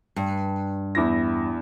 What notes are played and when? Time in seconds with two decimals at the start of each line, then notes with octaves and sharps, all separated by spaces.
0.16 G2
0.95 E2 E4 A#6